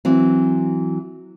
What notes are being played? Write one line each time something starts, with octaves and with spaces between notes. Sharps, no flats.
E3 F#3 C4